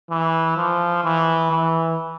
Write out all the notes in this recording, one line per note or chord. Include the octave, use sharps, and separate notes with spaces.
E3
F3
E3
E3